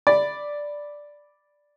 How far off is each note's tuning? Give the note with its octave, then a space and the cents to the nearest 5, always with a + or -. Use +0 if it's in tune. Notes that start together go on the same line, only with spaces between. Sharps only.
D5 +0 B5 +0